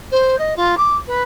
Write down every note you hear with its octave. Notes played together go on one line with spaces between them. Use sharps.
C5
D#5
F4
D6
B4